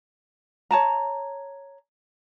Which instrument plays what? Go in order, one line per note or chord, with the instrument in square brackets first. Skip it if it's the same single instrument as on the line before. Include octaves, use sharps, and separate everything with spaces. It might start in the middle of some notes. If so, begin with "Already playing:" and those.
[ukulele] C#5 A5 A#5